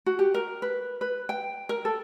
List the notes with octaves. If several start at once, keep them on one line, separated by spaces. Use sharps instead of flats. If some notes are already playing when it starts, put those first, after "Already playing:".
F#4
G4
A#4
B4
B4
G5
A#4
A4